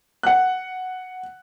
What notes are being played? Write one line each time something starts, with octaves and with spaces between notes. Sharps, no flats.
F#5 F#6